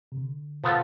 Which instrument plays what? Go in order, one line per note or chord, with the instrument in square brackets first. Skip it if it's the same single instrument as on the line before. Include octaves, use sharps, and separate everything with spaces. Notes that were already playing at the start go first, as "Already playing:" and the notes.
[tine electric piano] C3
D3
[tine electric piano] B2 [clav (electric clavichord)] F3 B3 F4 A4